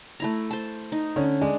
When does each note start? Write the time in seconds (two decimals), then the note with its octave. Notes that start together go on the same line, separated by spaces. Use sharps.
0.20 A3 E4 A#5
0.51 C5 A5
0.92 D#4
1.16 D3 C#4
1.41 G#3 D4